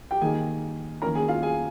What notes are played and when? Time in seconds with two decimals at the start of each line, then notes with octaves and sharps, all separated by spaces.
0.11 G4 G5
0.21 D#3 A#3 D#4 G#4 G#5
1.02 D#3 A#3 C#4 A#4 A#5
1.15 G#4 G#5
1.28 F4 F5
1.42 G#4 G#5